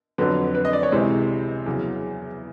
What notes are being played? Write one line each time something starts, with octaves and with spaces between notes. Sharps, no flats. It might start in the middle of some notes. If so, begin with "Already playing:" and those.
F2 D3 F#3 B4
B4
D#5
D5
C#5
C#2 C3 E3 G#3 C5
E2 C#3 F#3